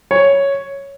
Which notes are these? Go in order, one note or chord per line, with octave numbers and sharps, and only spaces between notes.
C#5